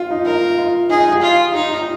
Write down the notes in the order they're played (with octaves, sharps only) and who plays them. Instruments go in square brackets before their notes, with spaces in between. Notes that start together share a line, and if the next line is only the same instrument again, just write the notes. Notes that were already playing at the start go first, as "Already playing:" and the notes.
Already playing: [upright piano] F4
D#4
[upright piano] F4 [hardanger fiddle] A#4
[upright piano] F4
[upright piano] D#4 [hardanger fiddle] G#4
[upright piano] F4
G4
[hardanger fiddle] F4
[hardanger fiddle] D#4 [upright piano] G4
[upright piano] F4